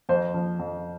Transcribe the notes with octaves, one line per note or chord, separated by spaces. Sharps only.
F2 C5
F3
F2